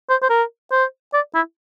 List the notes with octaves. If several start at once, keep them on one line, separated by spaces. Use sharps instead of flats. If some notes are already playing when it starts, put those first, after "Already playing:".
C5
C5
A#4
C5
D5
E4